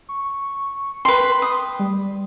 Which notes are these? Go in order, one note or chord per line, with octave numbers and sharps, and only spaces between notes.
C#6
B4 G5 C6
D#6
G3